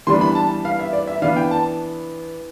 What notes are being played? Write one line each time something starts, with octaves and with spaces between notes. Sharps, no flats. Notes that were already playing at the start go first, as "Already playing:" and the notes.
E3 G3 B3 D4 C6
B5
A5
F5
E5
D5
E5
E3 B3 D4 F5
G5
A5